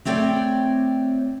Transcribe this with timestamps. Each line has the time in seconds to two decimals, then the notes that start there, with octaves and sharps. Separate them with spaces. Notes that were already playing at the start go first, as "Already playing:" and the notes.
0.05 A3 C4 C#5 D5 G5